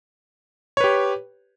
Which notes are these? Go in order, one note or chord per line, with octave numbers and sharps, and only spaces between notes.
G4 B4 C#5